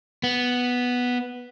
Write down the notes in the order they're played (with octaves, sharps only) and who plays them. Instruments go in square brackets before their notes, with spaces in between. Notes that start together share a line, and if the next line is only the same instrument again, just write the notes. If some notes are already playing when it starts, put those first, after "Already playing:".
[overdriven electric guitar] B3